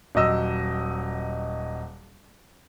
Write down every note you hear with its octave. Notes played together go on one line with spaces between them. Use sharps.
D#1 F#3 D#5 E6